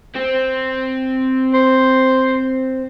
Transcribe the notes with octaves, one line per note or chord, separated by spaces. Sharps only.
C4
C5